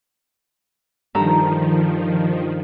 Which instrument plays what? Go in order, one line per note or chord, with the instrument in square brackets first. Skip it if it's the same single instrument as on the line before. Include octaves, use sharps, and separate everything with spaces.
[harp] G2 A4 A#5 [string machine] D#3 F3